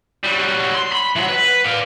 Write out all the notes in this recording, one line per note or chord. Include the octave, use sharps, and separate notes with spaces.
F#3 G3
C6
B5
E3 F#3
B4
D5 F5